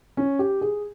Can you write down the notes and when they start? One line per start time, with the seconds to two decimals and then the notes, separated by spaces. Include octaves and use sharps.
0.17 C#4
0.39 G4
0.61 G#4